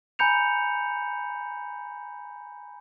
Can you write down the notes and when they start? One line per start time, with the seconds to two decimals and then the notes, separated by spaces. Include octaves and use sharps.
0.19 G#5 A#5 B5 G6 C#7 F7